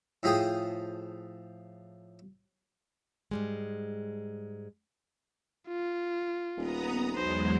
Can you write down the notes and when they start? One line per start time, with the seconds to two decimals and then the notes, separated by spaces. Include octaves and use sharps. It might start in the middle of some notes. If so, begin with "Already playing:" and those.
0.23 A2 F3 G#4 G5 D#6
3.31 G#2 G3 G#3
5.68 F4
6.57 D#1 B3 A#5 D#6
7.16 B1 E2 F#3 G#3 C5